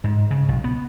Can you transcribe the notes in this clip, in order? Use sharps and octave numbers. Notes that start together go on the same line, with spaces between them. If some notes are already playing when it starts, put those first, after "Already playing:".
G#2
C#3
B1
B3